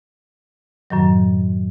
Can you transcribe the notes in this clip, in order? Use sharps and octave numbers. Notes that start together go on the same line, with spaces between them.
F#2 A2 D#3 F#3